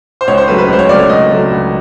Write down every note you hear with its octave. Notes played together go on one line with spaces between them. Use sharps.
C5
C#2 C#5
C5
C#3 F#3 A3 B4
B4
C#2 C5
C#5
C#3 F#3 A3 D5
C#5
C#2 D#5
C#3 F#3 A3
C#2